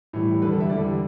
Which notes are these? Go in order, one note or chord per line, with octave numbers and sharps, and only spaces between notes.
A2 E3 G3
E2 D3 G3 B4
A4
E5
E2 D3 G3 D5